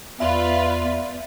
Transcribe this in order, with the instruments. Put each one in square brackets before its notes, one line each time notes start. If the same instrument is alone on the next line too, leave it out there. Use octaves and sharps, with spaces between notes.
[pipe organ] E2 [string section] F4 B4 [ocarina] D5 [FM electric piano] E5